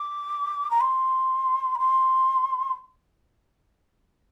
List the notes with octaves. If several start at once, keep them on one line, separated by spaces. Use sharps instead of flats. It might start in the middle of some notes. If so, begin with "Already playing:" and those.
Already playing: D6
A#5
C6
A#5
C6